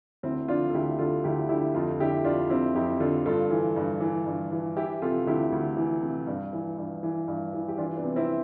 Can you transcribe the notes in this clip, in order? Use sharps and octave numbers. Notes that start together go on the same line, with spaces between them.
D2 C4 E4
D3 D4 F4
A4
D2 E4 G4
D3 F4 A4
D2 E4 G4
D3 E4 G4
F2 F4 A4
D3 E4 G4
F2 D4 F4
D3 C4 E4
F2 E4 G4
D3 F4 A4
G2 F4 A4
E3
G2
E3
G2
E3
E3 E4 G4
C3 F4 A4
D2 E4 G4
D2
E3
C3
G2
E3
G2
E3
G2
E3
G4
E3 D4 F4
B3 D4
C3
C4 E4